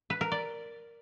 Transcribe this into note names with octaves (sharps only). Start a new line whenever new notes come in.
B4
A#4
D5